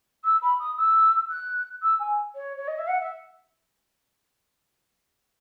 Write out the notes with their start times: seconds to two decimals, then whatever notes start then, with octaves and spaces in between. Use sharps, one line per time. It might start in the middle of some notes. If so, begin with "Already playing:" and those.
0.25 E6
0.42 B5
0.59 D#6
0.78 E6
1.30 F#6
1.82 E6
1.99 G#5
2.35 C#5
2.57 C#5
2.67 D#5
2.78 E5
2.88 F#5
3.01 E5